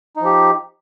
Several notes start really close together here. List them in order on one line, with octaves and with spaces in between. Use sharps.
D#4 F3 G4